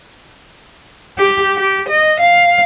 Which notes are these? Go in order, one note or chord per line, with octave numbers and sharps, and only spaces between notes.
G4
G4
D#5
F5